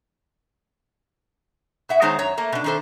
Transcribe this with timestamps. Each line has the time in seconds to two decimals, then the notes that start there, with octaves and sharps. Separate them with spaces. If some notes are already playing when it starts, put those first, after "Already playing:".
1.89 B2 E5 F#5
2.01 D#3 G#3 B3 D#4 C5 C#5
2.18 F#2 C#5 A#5
2.37 A3 A#3
2.52 B2 D4
2.64 D#3 C4 D4 A4 C5